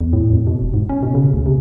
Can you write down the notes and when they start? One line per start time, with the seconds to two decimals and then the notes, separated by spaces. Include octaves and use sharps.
0.01 E2
0.13 A2
0.33 F2
0.47 B2
0.62 E1
0.74 G#2
0.89 C#4
1.03 B2
1.14 C#3
1.34 D2
1.46 C3